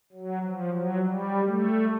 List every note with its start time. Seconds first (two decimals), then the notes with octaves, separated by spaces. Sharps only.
0.12 F#3
0.43 F3
0.72 F#3
1.02 G3
1.45 A3